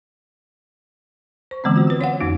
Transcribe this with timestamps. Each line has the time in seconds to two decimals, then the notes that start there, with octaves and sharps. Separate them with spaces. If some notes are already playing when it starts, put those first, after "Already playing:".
1.51 C5 C#6
1.64 D3 E3 G#3 B3 C4
1.75 E3 F4 F#4 C5
1.87 F4 B4
1.99 C#4 C#5 F5 F#5
2.20 F2 A#3 D#4 F#4